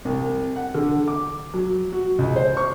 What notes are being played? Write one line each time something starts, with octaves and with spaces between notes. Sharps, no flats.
C2
F#5
D3
D6
F#3
F#4
C#2
C5
C#6